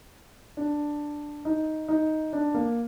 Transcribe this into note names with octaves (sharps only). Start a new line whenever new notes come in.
D4
D#4
D#4
D4
A#3